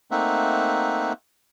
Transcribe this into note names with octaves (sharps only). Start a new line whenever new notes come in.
A3 A#3 C4 D#4 E5 F#5